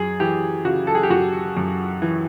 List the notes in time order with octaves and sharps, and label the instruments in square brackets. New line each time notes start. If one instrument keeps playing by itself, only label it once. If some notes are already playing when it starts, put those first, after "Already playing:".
Already playing: [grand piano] F#2 G#4
E3 G4
C#3 F#4
A4
G#4
G4
F#2 F#4
F#2
E3